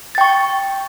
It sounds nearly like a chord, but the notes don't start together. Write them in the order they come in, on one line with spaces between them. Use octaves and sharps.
A6 G5 C#6